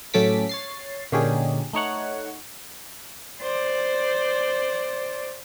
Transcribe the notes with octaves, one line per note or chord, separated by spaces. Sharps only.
A2 F#3 C#4 A4 D6 B6
C#5 A6 C7
A#2 D3 C#4 D#4 G4 G#4
A3 D#4 C#5 F#5
C5 D5